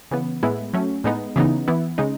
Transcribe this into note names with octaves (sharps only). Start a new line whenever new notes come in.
C#3 E3 B3
A2 G#3 B3 E4
F#3 A3 C#4
A2 G#3 B3 D#4
C#3 E3 B3 D#4
E3 B3 E4
C#3 G#3 D#4